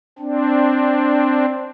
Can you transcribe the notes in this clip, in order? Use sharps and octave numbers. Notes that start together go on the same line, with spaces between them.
C4 D4